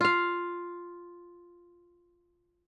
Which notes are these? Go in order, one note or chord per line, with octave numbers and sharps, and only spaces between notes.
F4 F5